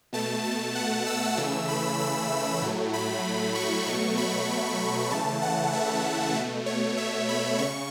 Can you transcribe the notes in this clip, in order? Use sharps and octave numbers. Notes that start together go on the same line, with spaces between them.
B2 A3 A5
A5
F#5
E6
C#3 E3 A3
B5
E6
A2 F#3 A3
B5
C#6
B2 F#3 A3 C#6
B5
C#3 E3 A3 A5
F#5
E5
B2 A3
C#5
E5
B5
C#3 C#6